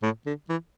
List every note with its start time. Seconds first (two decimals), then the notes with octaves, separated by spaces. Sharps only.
0.02 A2
0.26 D3
0.49 E3